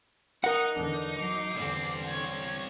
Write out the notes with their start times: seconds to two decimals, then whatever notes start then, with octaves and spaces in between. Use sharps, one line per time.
0.44 D#4 A#4 F#5 D#6 F#6
0.75 E2 D3 D4
1.19 F#3 D6 C7
1.57 E2 D3 G3 C4
2.09 C#5 G#6